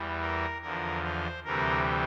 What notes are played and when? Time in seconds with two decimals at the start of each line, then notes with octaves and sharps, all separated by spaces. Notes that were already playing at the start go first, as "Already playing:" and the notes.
Already playing: E2 E3 G3
0.21 A#4
0.62 E2 D3 F3 A#4
1.03 C5
1.43 D2 C3 E3 G3 A#4